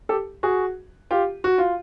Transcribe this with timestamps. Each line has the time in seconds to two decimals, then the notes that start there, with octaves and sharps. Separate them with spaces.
0.09 G4 A4
0.43 F#4 G#4
1.11 F4 G4
1.44 F#4
1.58 F4